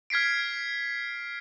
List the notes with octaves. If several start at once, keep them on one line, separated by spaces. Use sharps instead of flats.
F6 G#6 B6 C7 D7